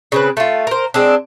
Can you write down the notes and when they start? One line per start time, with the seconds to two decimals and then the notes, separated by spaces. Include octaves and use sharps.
0.12 C#3 C4 B4
0.37 A3 F4
0.67 A#4 C5
0.94 G#3 C4 D4